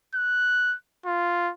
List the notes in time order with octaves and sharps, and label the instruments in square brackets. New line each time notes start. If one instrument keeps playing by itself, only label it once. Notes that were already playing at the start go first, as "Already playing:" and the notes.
[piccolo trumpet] F#6
F4